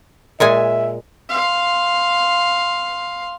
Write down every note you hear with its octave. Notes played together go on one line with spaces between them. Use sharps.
A#2 G#3 E5 G#5
F5 C6